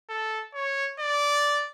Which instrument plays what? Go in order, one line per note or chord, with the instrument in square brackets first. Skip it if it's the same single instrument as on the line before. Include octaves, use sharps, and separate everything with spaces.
[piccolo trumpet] A4
C#5
D5